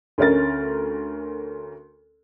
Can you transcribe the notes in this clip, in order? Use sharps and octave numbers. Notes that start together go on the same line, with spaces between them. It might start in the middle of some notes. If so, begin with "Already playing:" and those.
D2 C#4 A#4 A6